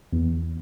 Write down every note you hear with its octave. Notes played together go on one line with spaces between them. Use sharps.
E2